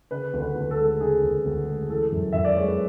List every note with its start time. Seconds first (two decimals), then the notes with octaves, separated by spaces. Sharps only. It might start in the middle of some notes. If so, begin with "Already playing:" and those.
0.11 C#3 B4
0.33 D2
0.41 B4
0.55 D2
0.71 A4
0.78 G#3
1.00 C#3 G#4
1.23 D2
1.45 D2
1.67 G#3
1.90 E3 A4
2.12 F#2
2.32 F#2 E5
2.44 D5
2.56 G#3 C#5
2.67 B4